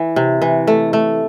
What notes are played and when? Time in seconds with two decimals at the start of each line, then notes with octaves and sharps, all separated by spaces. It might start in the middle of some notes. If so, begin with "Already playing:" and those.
Already playing: E3
0.16 C3
0.42 E3
0.67 A3
0.93 A3